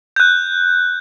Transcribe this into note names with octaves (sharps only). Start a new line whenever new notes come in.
F#6 G6